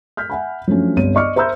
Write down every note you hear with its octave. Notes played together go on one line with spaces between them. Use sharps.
F6 G6 B6
E5 F#5 G#5 B5
F3 F#3 A3 C#4 D4
G1 C2 C#5 D#7
D5 D#5 C#6 D6 F6 C#7
C5 E5 A#5 B5 E6 G6